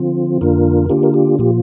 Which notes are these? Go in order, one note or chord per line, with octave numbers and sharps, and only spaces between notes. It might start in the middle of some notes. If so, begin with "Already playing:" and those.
Already playing: D3 F3 C4 F4
F2 D3 A#3 D4 F4 A#4
D3 A#3 D4 F4 G4
A#4
G4
A#2 F3 A#3 F4 G4